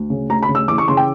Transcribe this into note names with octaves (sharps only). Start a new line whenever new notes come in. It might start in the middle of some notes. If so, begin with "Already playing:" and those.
Already playing: D2
C#3
D2 A#5
B5
C#3
E6
E3 D6
C#6
C#3 C6
G5